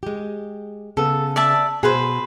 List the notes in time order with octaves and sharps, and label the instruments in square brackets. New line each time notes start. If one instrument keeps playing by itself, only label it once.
[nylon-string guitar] G#3 G4
[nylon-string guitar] C#3 B3 [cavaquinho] A4
[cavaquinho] D5 E5 A5
[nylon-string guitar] B2 [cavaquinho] G#4 B4 C5